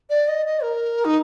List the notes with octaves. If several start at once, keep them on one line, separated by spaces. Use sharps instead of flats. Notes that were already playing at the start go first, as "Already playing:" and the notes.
D5
D#5
D#5
A#4
D#4